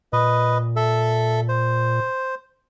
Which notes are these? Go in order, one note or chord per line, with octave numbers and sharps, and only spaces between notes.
A#2 B4 D#5
A4 E5
C5